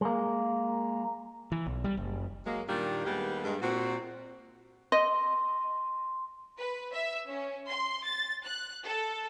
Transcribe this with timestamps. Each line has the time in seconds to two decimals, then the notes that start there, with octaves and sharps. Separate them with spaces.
0.01 G#3 A#3
1.52 E3
1.66 B1
1.84 G3
1.97 F#1
2.45 F#3 G#3 A#3
2.67 A#2 D#3 G3 A#3 D4 F4
3.05 D#2 G3 G#3 A#3 B3 G4
3.44 G2 G#3
3.62 A#2 C4 F#4
4.92 D#5 C6
6.59 B4
6.94 E5
7.29 C#4
7.68 C6
8.06 A6
8.44 F#6
8.85 A4